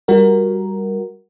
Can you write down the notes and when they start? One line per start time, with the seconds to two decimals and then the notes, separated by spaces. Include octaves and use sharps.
0.08 G3 F#4 A#4